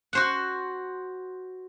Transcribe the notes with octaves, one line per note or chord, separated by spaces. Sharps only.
F#4 C5 F#5